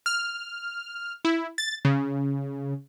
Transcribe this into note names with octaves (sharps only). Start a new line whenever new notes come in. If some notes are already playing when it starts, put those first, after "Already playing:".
F6
E4
A6
C#3